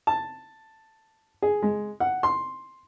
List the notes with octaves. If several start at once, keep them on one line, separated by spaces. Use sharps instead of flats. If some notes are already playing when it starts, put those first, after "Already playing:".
A5
G#4
G#3
F#5
C6